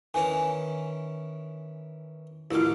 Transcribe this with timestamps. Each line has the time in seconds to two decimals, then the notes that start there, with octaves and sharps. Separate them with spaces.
0.14 D#3 E3 C#4 G#5
2.51 A1 D#3 E4 F4 D6